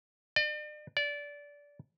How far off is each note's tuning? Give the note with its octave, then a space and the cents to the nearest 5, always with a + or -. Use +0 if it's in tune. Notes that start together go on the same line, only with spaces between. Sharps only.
D5 +40
D5 -20